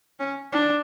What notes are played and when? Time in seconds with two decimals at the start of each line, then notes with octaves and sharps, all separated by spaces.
0.19 C#4
0.53 D4